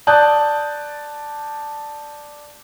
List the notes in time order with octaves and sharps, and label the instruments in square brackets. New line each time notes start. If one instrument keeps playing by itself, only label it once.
[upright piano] D5 A5 D#6 F#6 G6